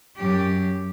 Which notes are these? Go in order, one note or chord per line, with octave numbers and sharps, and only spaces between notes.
F#2 G4